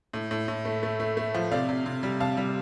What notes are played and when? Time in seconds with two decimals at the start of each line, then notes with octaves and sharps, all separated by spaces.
0.13 A2
0.31 A2
0.48 A2
0.65 A3
0.83 A3
1.00 A3
1.17 A3
1.34 F3
1.51 C3 D5 F5
1.69 C3
1.86 C3
2.03 G3
2.20 C3 F5 A5
2.37 G3